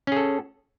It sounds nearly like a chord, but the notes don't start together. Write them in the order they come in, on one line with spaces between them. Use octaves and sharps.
C#4 G#4 A4